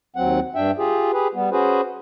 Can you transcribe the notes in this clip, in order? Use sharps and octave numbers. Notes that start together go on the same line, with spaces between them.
D#2 F#3 C4 F#5
G2 D4 E5 G5
F4 G4 G#4
G4 G#4 B4
G3 B3
C#4 F#4 G#4 B4 C5